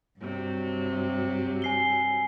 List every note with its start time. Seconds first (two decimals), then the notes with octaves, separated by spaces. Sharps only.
0.20 G2 C3 F#3
1.62 G#5 C7 G7